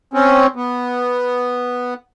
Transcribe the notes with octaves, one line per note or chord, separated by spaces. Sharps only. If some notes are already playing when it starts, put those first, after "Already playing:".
C4 C#4
B3